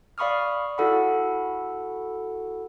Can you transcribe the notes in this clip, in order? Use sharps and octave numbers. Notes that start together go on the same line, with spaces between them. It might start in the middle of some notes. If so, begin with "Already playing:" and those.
D5 F5 B5 C#6 D#6 F6
E4 F#4 A4 F#5 B5